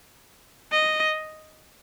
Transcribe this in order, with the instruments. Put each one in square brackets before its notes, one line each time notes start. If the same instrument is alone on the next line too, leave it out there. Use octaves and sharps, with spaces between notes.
[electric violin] D#5